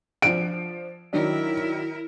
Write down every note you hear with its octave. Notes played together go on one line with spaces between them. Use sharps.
F3 D4 D7
D#3 F#3 D4 E4 A#4